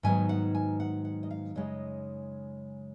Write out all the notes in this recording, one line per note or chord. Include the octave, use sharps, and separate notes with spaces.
G#2 D#3 F#3 B3 G#5
F#5
G#5
F#5
F#5
D#5
F5
F#2 C#3 G#3 D#4 D#5